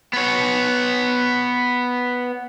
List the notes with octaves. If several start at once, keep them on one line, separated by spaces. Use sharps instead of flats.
B3 C#5